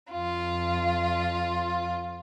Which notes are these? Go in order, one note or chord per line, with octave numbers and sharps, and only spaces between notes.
F2 F4